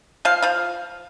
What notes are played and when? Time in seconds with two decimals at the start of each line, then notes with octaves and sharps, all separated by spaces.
0.25 F3 F5
0.42 F3 F5